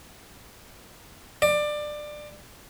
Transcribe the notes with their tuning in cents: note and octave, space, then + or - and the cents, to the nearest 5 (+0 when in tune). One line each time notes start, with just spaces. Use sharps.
D5 +20